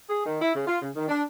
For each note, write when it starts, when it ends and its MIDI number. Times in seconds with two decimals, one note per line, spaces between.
0.09 0.24 68
0.25 0.40 51
0.42 0.53 64
0.55 0.62 49
0.66 0.81 65
0.82 0.90 49
0.96 1.08 51
1.08 1.22 62